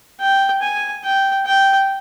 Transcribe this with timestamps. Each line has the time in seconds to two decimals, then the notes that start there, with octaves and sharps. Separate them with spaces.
0.20 G5
0.62 G#5
1.04 G5
1.46 G5